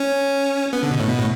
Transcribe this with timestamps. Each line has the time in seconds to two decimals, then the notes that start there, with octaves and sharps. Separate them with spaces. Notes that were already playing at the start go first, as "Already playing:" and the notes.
Already playing: C#4
0.73 B3
0.83 D3
0.91 B2
1.00 A2
1.09 B2
1.18 A2